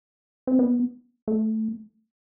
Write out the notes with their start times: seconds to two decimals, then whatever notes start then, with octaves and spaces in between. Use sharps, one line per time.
0.47 C4
0.59 B3
1.28 A3